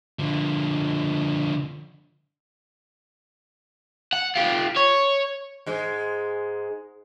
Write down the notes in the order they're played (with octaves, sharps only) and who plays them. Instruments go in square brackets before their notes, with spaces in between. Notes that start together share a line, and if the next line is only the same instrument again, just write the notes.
[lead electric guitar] D3 F3
[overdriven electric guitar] F#5
F4 G4
C#5
[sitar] G#2 G#3